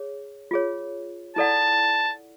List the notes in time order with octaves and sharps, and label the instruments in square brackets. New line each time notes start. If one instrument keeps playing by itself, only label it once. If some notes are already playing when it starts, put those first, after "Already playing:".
Already playing: [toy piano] G#4 C#5
F4 G#4 C#5
[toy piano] E4 A4 D5 F#5 [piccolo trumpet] A5